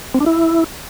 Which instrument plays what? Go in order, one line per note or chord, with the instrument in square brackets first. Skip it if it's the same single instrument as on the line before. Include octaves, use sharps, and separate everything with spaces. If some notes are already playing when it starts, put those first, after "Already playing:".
[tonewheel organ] C4
D4
E4